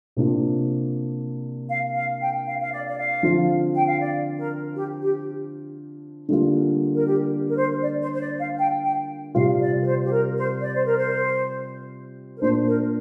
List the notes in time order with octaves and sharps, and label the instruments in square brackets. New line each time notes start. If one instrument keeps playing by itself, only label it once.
[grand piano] C3 A#3 D4 F4
[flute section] F5
F5
G5
F5
F5
D5
D5
F5
[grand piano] D3 F3 C4 F4
[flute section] G5
F5
D5
A#4
G4
G4
[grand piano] D3 G3 A#3 F4
[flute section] A#4
G4
A#4
C5
D5
C5
C5
D5
F5
G5
G5
[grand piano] C3 G3 C4 F4 [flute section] F5
[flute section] D5
A#4
C5
G4
A#4
C5
D5
C5
A#4
C5
A#4
[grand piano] A#2 A#3 D4 [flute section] C5
[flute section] A#4